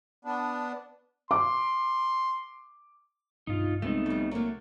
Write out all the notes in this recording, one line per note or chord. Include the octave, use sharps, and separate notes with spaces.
B3 D4
C6 D6
B1 G2 D#4 F4
C2 G#3 A3 B3 C4 D#4
F2 G3
F#3 A3 A#3